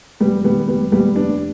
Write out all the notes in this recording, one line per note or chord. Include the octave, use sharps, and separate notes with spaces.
F1 G3 B3
D#3 G3 B3
F1 G3 B3
D#2 G3 B3
F1 B3 D4